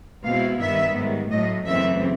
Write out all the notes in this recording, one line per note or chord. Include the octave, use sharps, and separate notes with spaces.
B2 G#3 C4 E4 F5
G2 D#3 G3 B3 E5
G#2 D#3 G3
A2 F#3 A3 D#5
F#2 C#3 E3 A3 C4 E5